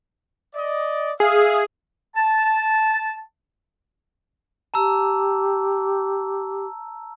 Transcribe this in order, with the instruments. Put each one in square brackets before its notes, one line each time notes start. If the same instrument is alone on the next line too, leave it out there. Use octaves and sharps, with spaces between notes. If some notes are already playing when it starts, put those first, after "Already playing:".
[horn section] D5 D#5
[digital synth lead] G#4 [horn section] E5 F5
[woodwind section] A5
[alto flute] G4 [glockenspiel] A5 A#5 E6